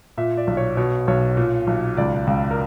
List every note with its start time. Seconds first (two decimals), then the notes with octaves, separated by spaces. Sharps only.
0.18 A#2 E5
0.37 D5
0.47 B1
0.57 C#5
0.77 B2 C#5
1.08 B1 C#5
1.37 A#2
1.67 B1
1.97 C#2 D5
2.27 C#2
2.51 A#4